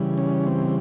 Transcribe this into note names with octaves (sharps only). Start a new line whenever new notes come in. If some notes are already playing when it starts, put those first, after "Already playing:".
Already playing: C#3 E3 G3
C#4
C4